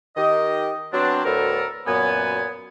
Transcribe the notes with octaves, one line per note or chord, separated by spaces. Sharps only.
D#3 G4 D#5
F#3 B3 C4 D4
D2 A2 D3 B3 A4 A#4
F#2 A#2 B3 G#5